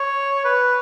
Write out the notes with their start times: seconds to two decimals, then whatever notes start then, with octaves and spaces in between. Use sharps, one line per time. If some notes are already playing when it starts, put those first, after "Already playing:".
Already playing: C#5
0.45 B4